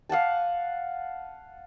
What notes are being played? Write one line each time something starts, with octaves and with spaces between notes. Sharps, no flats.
F5 F#5 G#5 A5